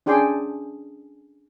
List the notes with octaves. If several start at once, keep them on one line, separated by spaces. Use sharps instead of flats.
C#4 D4 G#4 G5 C6 D6